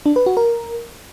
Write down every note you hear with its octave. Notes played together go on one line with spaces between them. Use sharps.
D4
B4
F#4
A#4